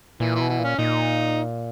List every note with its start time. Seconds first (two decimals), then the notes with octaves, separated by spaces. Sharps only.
0.20 A#2 E3
0.35 E3
0.40 B2
0.49 E3
0.59 A#2 C#4
0.78 A#2 D#4